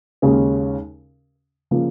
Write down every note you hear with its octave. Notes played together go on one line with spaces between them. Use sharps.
D#2 C#3 G#3 C#4
C#3 F3 A#3